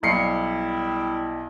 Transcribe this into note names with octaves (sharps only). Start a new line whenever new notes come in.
B1 G3 E4 C7 C#7